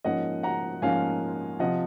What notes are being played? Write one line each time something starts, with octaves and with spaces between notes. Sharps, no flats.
G#2 F3 A#3 C#4 D#5 F#5
F#5 A#5
G#2 F3 A#3 C#4 F5 G#5
C3 F3 D#5 F#5